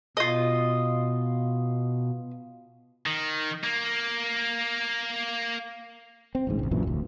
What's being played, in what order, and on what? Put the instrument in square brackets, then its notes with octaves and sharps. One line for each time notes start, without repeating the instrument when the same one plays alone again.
[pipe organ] B2 [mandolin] F4 D#5
[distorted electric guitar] D#3
A#3
[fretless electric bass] C4
A1 D2 G#2
G#1 C#2
A#1 F#2 A#2 E3
F1 D2